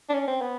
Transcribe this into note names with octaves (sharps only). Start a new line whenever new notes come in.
D4
C#4
C4
B3